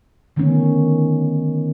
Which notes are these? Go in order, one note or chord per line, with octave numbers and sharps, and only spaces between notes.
D3 D#3 A3 B3 C#4